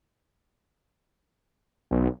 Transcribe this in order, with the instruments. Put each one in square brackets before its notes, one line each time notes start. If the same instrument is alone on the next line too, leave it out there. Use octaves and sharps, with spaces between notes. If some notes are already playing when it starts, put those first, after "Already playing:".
[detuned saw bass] B1